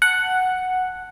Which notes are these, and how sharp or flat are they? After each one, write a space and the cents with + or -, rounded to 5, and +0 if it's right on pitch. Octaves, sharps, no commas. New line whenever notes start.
F#5 +0 A5 +0